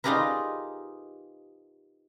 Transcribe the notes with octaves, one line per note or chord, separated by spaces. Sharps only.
D#4 F4 G4 G#4 A#4 B4